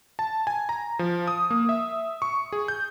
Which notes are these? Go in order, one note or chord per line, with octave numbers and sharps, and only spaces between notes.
A5
G#5
A#5
F3
D#6
A#3
E5
C#6
G#4
G6